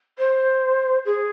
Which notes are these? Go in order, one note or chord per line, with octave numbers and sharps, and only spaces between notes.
C5
G#4